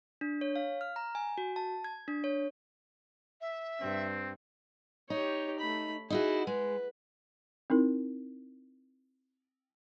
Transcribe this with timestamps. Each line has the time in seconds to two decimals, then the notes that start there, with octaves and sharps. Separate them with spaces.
0.21 D4
0.41 C#5
0.56 F5
0.81 F6
0.96 A#5
1.15 G#5
1.38 F#4
1.56 A5
1.84 G#6
2.08 D4
2.24 C#5
3.41 E5
3.81 G2 C4
5.10 D#4 G4 C#5
5.60 A3 B5
6.10 D#4 E4 F#4 G#4
6.47 G#3 B4
7.70 C4 D#4 E4 A#4